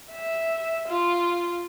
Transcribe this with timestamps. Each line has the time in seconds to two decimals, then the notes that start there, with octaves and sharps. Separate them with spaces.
0.11 E5
0.89 F4